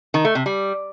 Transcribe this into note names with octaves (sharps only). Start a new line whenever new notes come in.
D#3
A3
C3
G3